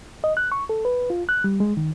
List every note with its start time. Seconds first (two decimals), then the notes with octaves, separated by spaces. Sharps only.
0.24 D#5
0.37 F#6
0.52 C#6
0.69 A4
0.85 B4
1.10 F4
1.29 F#6
1.44 G3
1.60 G#3
1.77 D#3